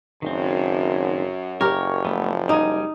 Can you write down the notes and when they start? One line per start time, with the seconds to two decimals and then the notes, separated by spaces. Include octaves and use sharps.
0.22 F#1 F#2 D#3 C4
1.61 F#1 G4 A#4 C#5
2.05 F3 A3 B3
2.49 G3 D#4 G#5